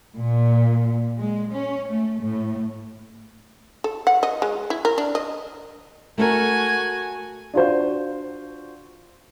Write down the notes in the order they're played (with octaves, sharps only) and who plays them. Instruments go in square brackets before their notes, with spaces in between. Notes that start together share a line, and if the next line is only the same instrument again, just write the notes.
[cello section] A#2
G#3
C#4
A3
A2
[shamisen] A4
F#5
D#5
G#3
E4
A#4
D4
D#5
[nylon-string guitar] A3 A4 A#4 [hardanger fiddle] F#4 G#5
[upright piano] D4 F4 F#4 C5